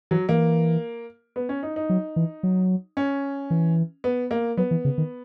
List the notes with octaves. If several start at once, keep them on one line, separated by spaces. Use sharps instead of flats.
E3 F#3
E3 A#3
B3
C#4
D#4
D#4
F#3
E3
F#3
C#4
E3
B3
A#3
F#3 B3
E3
C#3
D#3